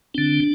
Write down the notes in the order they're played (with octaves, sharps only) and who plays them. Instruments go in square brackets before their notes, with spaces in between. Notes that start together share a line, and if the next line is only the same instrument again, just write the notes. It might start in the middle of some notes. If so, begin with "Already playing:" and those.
[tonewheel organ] D3 C4 D4